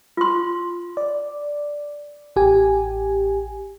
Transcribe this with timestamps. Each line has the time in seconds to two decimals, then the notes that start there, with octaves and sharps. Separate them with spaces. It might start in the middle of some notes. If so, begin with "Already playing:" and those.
0.17 F4 C6
0.97 D5
2.36 A1 G4 G#5